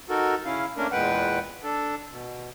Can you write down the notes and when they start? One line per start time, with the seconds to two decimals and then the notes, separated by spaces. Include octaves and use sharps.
0.09 D#4 F#4 A4 A#4
0.45 C#3 C#4 E4 F5
0.77 A3 A#3 C#4 D4 A#4
0.92 E2 A#2 G#3 B4 F#5 G5
1.63 D4 A4
2.11 B2